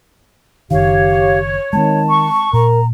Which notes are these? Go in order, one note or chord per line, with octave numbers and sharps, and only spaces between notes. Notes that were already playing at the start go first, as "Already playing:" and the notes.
F#1 D#3 G4 C#5 F5
D#3 G#3 B3 C4 A5
C#6
A#2 A#4 A#5